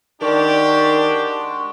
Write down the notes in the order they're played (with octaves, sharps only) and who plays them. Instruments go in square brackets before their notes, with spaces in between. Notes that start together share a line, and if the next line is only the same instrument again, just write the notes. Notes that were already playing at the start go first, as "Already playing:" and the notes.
[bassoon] D#3 [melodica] G#3 F#4 [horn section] D4 G4